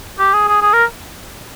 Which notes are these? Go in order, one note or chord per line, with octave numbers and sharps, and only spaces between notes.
G4
G#4
G#4
G#4
A#4